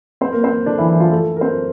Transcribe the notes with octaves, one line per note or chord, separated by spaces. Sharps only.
C4 C5
A#3 A#4
C4 C5
D3 D4
E3 E4
E3 E4
F3 F4
A3 A4
A#4
C4 C5